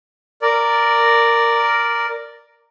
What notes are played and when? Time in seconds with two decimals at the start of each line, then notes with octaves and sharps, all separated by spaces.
0.42 A#4 D5